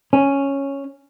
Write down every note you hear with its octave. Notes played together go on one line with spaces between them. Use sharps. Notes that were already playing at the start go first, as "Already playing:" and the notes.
C#4